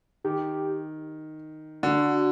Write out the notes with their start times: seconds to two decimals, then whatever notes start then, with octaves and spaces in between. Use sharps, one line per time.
0.24 D#3 G4
1.83 D3 F#4